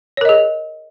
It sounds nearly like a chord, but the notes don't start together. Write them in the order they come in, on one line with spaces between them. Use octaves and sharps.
C#5 A#4 D#5 G#4